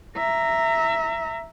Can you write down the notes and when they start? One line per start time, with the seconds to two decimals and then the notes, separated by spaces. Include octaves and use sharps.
0.17 E5 A#5